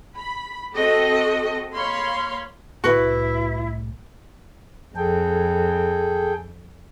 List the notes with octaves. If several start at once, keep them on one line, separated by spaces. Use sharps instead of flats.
B5
C4 F#4 A4 D#5
A#3 C#5 F5 B5 C6
C2 A2 E4 F#4 B4
F2 G#4 A4 G5